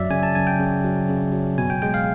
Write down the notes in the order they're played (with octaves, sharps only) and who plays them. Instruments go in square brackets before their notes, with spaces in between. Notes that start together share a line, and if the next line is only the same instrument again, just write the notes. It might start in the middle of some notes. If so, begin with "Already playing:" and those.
Already playing: [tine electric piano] F#2 F#3 D5 E5
C#3 G#5
A5
F#2 G#5
G5
C#3
F#3
C#3
F#3
B2 G#5
G5
G#3 G5
F5